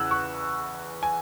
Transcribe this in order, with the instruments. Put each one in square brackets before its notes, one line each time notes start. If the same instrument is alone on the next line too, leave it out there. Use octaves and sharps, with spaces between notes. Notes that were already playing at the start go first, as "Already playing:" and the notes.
Already playing: [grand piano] E2 C#3 E3 E6 F#6 G#6
C#6
G#5